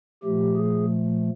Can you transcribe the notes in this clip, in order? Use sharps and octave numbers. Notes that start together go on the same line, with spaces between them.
A#2 F3 A3 G4
G#4